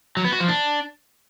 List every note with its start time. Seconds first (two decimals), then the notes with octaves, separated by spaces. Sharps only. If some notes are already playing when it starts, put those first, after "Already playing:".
0.17 F#3
0.25 B3
0.33 F#4
0.40 F3
0.48 D4